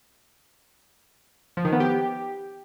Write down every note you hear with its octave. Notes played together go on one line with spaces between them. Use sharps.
F3
D#3
B3
G4